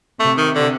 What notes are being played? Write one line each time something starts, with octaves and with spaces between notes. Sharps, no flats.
C3 A3
D#3
D3